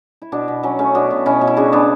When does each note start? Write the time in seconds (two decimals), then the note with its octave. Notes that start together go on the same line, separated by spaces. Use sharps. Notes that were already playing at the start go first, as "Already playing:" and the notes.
0.22 E4
0.32 B2 B3 D4
0.48 B2
0.63 F#3 C#4
0.79 A3 C#4
0.95 B2 B3 D4
1.10 B2
1.26 B2 C#4 E4
1.41 B2
1.47 E4
1.57 C#3 D4 F#4
1.72 E3 B3 D4